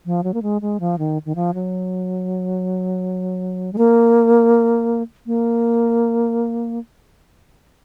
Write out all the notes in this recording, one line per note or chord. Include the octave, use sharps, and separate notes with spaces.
F3
F#3
A#3
G#3
G#3
F3
D#3
D#3
F3
F#3
G#3
A#3
A#3